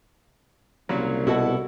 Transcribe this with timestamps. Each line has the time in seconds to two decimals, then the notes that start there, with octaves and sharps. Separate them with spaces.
0.89 C2 A#2 C#3 F#3
1.27 B2 E4 F#4 A4